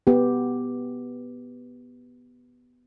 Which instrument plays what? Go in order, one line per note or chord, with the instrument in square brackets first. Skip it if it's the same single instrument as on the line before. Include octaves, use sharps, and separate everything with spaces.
[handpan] B3 G4